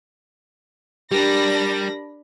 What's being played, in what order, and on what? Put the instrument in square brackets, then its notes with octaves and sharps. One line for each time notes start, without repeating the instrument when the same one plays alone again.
[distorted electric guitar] G3 [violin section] D4 B5 A#6 [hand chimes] G4 A#4